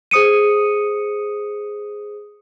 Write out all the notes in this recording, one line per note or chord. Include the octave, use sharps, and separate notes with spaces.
G#4 C5 D#6 C#7 D#7